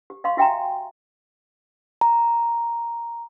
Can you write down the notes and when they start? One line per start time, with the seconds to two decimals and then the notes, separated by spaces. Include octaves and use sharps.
0.10 G4
0.24 D#5 F5 C6 C#6
0.37 F#4 E5 G5 G#5 A#5
2.01 A#5